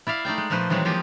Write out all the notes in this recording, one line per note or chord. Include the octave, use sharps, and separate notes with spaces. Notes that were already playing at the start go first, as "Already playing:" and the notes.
E4 D5 E5 F5
A3 D#4 D5 G5
G#3
A#2 F3 A3 B4 C5
D#3 E3 F#3 G#3 C4
F3 G#3 A#3 D#4 F4 G4